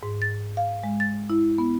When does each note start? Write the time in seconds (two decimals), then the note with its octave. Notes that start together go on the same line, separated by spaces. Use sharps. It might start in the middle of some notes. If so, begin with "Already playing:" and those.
0.03 G#2
0.22 A6
0.57 F5
0.84 G#3
1.00 A6
1.30 E4
1.58 B3